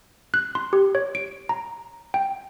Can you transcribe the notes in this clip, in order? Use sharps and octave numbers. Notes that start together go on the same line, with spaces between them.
F#6
C6
G4
C#5
D7
A#5
G5